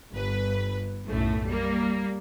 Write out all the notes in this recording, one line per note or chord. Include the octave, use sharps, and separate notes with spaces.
G1 B4
B1 F#2 A2 A3
G3 A#3